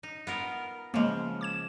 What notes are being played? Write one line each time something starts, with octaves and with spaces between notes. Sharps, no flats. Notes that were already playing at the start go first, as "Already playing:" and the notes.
D#4
B3 F4 A#4
C#3 F3 G#3 A#3
D6 G#6 E7